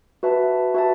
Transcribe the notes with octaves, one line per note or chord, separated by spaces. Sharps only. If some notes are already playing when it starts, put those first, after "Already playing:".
F#4 B4 E5 A5
F#4 B4 E5 A5